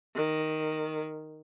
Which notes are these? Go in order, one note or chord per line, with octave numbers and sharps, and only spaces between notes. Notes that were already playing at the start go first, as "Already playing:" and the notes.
D#3